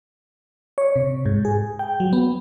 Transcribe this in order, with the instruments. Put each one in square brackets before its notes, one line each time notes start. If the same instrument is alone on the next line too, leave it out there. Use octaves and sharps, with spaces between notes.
[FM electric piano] C#5
C3
G#2
G#4
G5
F#3
B3